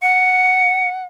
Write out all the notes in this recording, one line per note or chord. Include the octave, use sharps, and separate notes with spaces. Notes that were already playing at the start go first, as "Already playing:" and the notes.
F#5 C#7